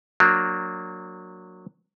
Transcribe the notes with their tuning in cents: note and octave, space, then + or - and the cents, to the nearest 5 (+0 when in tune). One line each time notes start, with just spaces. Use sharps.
F#3 -15 A#3 -15 D4 +0